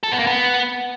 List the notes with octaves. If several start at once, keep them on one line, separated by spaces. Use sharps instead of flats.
A4
B3
A#3
B3